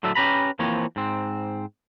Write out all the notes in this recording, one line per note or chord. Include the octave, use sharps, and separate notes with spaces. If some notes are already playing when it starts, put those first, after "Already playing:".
A2 D3 F#3 A4 E5
C#4 G4 B4 A#5 B5
E3 F3 A#3 C4 C#5
G#2 C4